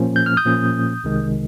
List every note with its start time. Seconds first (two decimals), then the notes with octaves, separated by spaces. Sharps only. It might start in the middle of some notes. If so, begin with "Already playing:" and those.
Already playing: A#2 F3 A#3 C#4
0.16 G6
0.26 F6
0.37 D#6 G6
0.45 A#2 F3 A#3 C#4
1.04 C2 C3 D#3 G#3